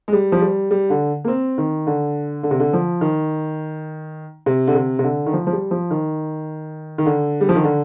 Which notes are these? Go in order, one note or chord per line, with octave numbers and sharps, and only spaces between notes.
G#3
G3
F3
G3
G3
D3
A#3
C4
D#3
D3
D3
C3
D3
F3
D#3
C3
D3
C3
C3
D3
D#3
F3
F3
G3
F3
D#3
D#3
D3
G3
F3
D#3
D3